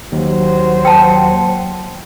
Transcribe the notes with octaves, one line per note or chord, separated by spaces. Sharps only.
D#2 F#3 C5
G5 A5